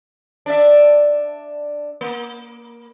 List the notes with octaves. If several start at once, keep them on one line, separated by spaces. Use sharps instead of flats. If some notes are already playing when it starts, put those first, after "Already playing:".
D4 D5 E5
A#3